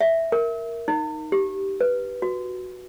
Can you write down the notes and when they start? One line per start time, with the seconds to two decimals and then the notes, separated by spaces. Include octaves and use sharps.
0.01 E5
0.32 A#4
0.88 D#4
1.32 G4
1.81 B4
2.22 F#4